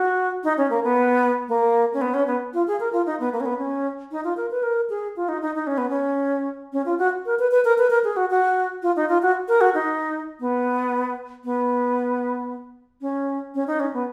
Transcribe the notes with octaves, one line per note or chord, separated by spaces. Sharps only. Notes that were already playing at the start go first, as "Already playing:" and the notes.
Already playing: F#4
D#4
C#4
A#3
B3
A#3
C#4
B3
C#4
B3
F4
G#4
A#4
F4
D#4
B3
A#3
C#4
B3
C#4
D#4
F4
A#4
B4
A#4
G#4
F4
D#4
D#4
D#4
C#4
B3
C#4
C#4
F4
F#4
A#4
B4
B4
A#4
B4
A#4
G#4
F#4
F#4
F4
D#4
F4
F#4
A#4
F#4
D#4
B3
B3
C#4
C#4
D#4
C#4
B3